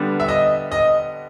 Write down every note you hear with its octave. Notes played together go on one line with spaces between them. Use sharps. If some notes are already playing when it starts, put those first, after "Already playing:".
Already playing: D3 G3 B3 D4
E5
D#5
D#5